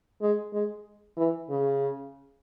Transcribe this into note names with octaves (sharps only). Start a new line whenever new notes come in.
G#3
G#3
E3
C#3